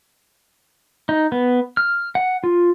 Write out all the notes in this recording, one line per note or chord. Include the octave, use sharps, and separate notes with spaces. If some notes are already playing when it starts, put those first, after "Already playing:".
D#4
B3
F6
F#5
F4